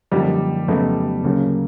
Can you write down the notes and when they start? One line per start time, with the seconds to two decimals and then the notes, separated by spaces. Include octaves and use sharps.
0.11 F#2 D3 F3 G3 A#3 D#4
0.68 F2 C#3 F#3 A3 B3 D#4
1.24 D2 C#3 F#3 A#3